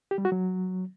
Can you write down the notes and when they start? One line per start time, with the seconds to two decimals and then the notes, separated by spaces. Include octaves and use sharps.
0.11 G4
0.18 G3
0.25 F#4
0.32 F#3